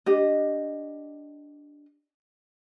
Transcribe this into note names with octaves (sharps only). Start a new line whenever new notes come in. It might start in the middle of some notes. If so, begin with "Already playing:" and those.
D4 G4 D#5